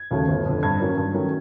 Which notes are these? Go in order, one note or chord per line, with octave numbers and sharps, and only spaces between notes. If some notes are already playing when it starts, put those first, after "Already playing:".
Already playing: G#6
D#2 C#3 F#3 A3
G1
F2 D3
G2 G#6
D#3 F#3 A#3 C#4
G2
D#3 F#3 A3 C#4